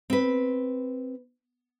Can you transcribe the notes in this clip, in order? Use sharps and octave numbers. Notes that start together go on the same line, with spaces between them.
C4 B4